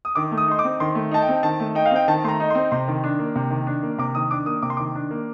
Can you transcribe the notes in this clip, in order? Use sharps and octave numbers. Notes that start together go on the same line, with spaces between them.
D#6
D#3 D6
A3
D#6
D#4 C6
D6
C4
D#3 C6
A3
D#4 A5
G5
C4
D#3 A5
A3
D#4 G5
F5
C4 G5
D#3 A5
A3 A#5 C6
D#4
C4 C6
C3 C6
D#3
D4
A#3
C3
D#3
D4
A#3
C3 D6
D#3 D#6
D4 D6
A#3 D#6
C3 D6
C6
D#3 D6
D4
A#3